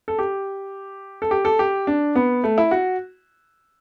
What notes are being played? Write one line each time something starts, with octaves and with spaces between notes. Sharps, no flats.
A4
G4
A4
G4
A4
G4
D4
B3
A3
E4
F#4